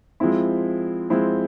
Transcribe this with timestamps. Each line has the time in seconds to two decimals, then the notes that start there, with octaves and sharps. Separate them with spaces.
0.20 F3 G#3 C4 E4
1.10 F3 G#3 C4 E4